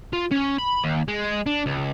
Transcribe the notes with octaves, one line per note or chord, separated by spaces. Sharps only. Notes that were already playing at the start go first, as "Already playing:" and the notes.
F4
C#4
B5
D#2
G#3
D4
C#2